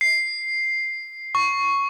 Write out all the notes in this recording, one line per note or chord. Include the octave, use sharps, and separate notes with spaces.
C7
C#6